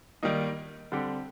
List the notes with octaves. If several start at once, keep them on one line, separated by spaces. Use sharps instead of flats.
D#3 G3 A#3 D#4
D3 G3 C4 G4